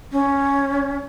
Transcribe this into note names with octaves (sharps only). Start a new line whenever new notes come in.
C#4